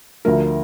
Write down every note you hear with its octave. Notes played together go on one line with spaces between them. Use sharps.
D2 D3 F3 A3 A#4